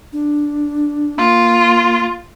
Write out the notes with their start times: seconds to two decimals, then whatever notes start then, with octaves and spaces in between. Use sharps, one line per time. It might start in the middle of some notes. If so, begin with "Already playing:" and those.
0.13 D4
1.19 A#3 F4